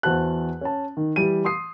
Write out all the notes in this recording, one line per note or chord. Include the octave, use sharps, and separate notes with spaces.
E2 F#4 C5 A5 F#6
C#4 A5
D#3
E3 G3 D#7
C6 D#6 C7